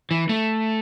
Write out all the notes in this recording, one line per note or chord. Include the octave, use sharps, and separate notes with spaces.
E3
A3